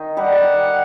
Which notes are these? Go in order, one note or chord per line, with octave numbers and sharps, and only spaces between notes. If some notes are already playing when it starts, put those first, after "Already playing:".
Already playing: D#3 D#4
G3 G4 F#5